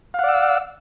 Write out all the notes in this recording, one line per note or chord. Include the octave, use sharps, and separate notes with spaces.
D5 F5 F#5 E6